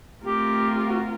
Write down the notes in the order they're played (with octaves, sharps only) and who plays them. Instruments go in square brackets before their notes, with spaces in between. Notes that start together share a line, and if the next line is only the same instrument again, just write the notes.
[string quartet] A3 C4 F4 A#4 [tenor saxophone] G4
[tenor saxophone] G4
F#4